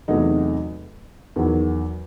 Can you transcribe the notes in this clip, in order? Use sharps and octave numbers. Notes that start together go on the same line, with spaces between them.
E2 C3 F#3 A3 D#4
E2 D#3 F#3